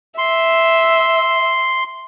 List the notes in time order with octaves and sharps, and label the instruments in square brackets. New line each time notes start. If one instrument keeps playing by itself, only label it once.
[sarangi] E5 [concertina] C6